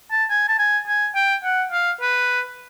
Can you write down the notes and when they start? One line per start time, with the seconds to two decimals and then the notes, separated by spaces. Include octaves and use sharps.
0.11 A5
0.30 G#5
0.48 A5
0.59 G#5
0.87 G#5
1.15 G5
1.44 F#5
1.71 F5
2.01 B4